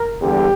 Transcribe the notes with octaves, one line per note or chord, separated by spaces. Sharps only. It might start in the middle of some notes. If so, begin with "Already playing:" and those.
Already playing: A#4
E2 D3 G3 G4